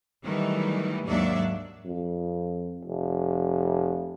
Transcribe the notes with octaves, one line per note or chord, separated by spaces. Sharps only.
D#3 E3 F#3 G3 A3 D#4
D#2 G#2 F#3 D4 D5 E5
F2
F1